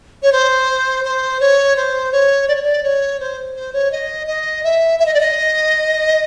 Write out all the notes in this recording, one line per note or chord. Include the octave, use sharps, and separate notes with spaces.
C#5
C5
C5
C#5
C5
C#5
D5
C#5
D5
C#5
C5
C5
C#5
D#5
D#5
E5
E5
D#5
D5
D#5